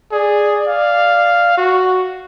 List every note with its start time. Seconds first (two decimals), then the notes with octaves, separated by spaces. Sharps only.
0.12 G#4 D5
0.67 F5
1.58 F#4